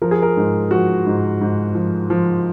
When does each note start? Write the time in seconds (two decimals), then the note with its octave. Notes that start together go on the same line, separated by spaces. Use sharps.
0.02 F3 A#4
0.11 G#4
0.22 A#4
0.37 G#2
0.71 F3 F#4
1.06 G#2
1.41 G#2
1.75 F3
2.10 F3